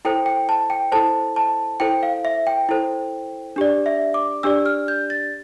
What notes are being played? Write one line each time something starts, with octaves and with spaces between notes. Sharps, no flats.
E4 A4 C5 G5
G5
A5
G5
E4 A4 C5 A5
A5
E4 A4 C5 G5
F5
E5
G5
E4 A4 C5
D4 G4 D5
E5
D6
D4 G4 D5 E6
F6
G6
A6